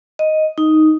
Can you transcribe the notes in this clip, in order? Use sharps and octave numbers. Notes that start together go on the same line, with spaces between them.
D#5
D#4